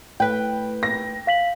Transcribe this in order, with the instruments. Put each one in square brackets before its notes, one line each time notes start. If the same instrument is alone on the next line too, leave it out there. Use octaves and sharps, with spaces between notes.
[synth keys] A2 B4 [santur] G5
[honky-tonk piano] A#6
[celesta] F5 B6 F#7